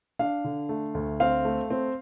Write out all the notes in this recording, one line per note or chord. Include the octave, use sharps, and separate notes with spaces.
D4 F5
D3
A3
D2
C4 F5
A3
C4